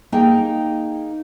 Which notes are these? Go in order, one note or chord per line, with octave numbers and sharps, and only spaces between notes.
A#3 D#4 G#4 G5